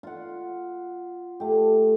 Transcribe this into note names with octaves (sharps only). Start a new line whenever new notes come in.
F4 F#5
A3 G4